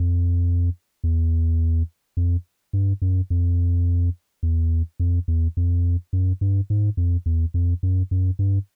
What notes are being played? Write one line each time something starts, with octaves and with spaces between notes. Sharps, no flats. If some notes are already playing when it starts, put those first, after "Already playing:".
Already playing: F2
E2
F2
G2
F#2
F2
E2
F2
E2
F2
F#2
G2
G#2
F2
E2
F2
F#2
F#2
G2